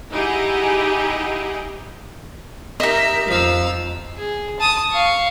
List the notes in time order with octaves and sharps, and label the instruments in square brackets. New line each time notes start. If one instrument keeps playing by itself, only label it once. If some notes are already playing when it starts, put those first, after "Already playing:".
[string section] D#4 E4 G4 G#4 F#5
[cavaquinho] D#4 D#5 [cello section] G4 A#4 [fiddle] E5
[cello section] F2 [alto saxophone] F3 [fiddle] F5 E6
[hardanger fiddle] G#4
A5 D#6
F5 C#6